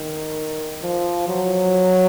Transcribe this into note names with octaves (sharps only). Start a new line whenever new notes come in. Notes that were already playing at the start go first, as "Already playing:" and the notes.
Already playing: D#3
F3
F#3